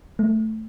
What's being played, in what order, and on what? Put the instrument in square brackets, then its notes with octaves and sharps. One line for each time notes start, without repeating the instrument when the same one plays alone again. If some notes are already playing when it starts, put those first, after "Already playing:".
[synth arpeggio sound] A3